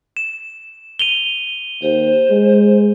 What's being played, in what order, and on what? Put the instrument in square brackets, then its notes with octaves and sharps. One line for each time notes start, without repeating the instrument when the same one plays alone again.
[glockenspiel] E7
D#7 F7 G7
[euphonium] D#2 [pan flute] C5
[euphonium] G#3